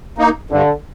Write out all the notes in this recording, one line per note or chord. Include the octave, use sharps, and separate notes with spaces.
A#3 D#4
G2 D3